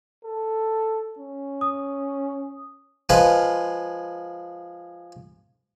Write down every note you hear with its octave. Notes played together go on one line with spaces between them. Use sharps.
A4
C#4
D#6
F3 G#3 G#4 B4 F5 C6